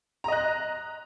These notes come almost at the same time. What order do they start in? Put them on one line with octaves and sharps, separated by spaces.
A#5 D#5 F#6